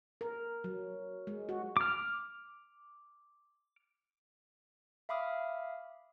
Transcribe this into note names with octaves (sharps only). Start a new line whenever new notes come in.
A#4
F#3
G#3
F#4
D6 F6
E5 F5 B5 D6 D#6 F6